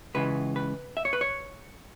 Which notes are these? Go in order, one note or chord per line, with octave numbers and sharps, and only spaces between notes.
C#2 C#3 E3 B4
B4
E5
C#5
B4
C#5